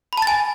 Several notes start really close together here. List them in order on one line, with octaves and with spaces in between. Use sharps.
B5 A5 A6 G#5